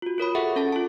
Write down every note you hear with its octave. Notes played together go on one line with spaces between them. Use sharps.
F4 F#4
F4 A#4 C#5 B5
G#4 A4 E5 F#5
C#4 A4 A5 A6
F4 A5